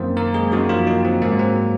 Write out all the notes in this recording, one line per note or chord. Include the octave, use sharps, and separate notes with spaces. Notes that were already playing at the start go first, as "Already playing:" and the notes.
Already playing: F#2 D#3 A#3 C4 C5
A#3 A#4
G#3 G#4
F#2 D#3 F#3 A#3 F#4
F3 F4
D#3 D#4
C4
G#2 F#3 A#3
C4